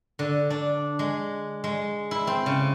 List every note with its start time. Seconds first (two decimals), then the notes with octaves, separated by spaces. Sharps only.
0.19 D3
0.50 D4
0.99 G#3
1.64 G#3
2.11 E4
2.27 C4
2.46 C#3